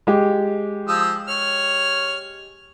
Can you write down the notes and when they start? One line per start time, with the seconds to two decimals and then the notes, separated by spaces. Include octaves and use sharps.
0.07 G#3 G4
0.88 F3 D#6 E6
1.28 C#5 F6